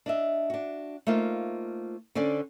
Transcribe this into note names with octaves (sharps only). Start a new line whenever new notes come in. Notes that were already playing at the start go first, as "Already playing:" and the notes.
D4 D#5 E5
D4 F#4
A3 A#3 D#4 F4 C5
D3 C#4 C5 D5